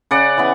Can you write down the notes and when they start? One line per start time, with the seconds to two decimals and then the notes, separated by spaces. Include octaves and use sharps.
0.11 C#3 D5 F#5
0.37 E3 B3